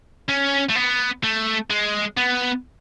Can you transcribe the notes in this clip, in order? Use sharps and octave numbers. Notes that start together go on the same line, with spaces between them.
C#4
A3
B3
A3
G#3
B3